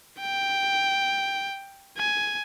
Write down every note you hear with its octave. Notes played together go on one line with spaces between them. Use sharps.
G5
G#5